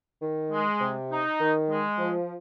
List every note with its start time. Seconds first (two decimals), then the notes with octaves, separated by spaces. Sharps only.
0.22 D#3
0.51 G#3
0.80 C3
1.10 D#4
1.40 D#3
1.69 G#3
1.98 F3